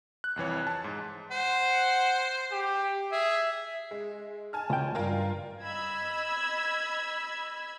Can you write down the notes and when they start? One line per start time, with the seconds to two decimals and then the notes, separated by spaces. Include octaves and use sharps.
0.24 F#6
0.36 C2 F2 E3 C#5
0.67 A5
0.84 G#2
1.31 C5 F#5
2.52 G4
3.12 G#4 E5
3.91 G#3
4.53 G#5 A5 F6
4.70 C#2 G5
4.95 C#2 G2 F4 A#4
5.63 D#5 B5 E6 G#6